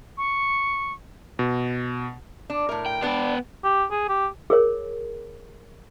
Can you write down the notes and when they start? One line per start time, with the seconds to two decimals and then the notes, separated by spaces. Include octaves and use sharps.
0.18 C#6
1.39 B2
2.50 D4
2.69 A2 A#4
2.86 G5
3.02 B3 D4 B4 G5
3.64 G4
3.91 G#4
4.09 G4
4.50 G#4 A#4 C#5